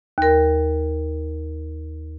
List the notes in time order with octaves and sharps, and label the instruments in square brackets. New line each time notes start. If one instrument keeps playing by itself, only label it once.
[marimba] D#2 A#4